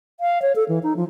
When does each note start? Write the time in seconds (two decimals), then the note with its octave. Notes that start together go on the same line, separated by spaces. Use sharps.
0.20 F5
0.42 C#5
0.56 A4
0.69 E3
0.83 D#4
0.97 F3